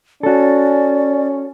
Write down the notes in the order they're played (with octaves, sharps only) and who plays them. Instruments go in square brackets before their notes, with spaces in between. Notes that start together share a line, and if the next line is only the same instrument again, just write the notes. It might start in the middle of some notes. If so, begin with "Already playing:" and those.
[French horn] C#4 [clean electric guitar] F#4 A4 [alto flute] D5